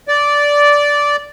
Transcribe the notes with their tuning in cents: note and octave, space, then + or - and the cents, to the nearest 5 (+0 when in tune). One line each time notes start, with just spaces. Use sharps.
D5 -10